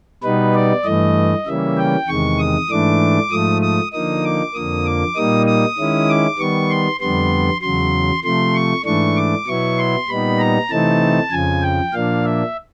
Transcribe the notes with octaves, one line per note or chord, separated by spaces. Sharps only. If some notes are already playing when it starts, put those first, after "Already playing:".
B2 G3 B3 D#4 B4
D5
G2 E3 A3 D#5
C#3 E3 G3 A#3 C#4 E5
G5
E2 C3 D#3 G#3 C#6
D#6
G#2 E3 A3 D4 D6
G#2 F3 A3 D#6
D#6
D3 F3 A#3 D#4 D#6
D6
F2 D3 F3 A#3 D#6
D6
A#2 G3 A#3 D#4 D#6
D#6
D#3 G#3 C#4 E4
D6
D#3 G3 B3 C#6
C6
F2 D3 G3 B3 C6
E2 C#3 F#3 C6
C3 F3 A3 C6
C#6
G#2 E3 A3 D4 C#6
D6
B2 F#3 B3 E4 C#6
C6
A#2 G3 B3 D#4 B5
A#5
C3 E3 A3 C4 D#4 A5
F2 C#3 F3 G#5
G5
A#2 F3 A#3 D4 F5
E5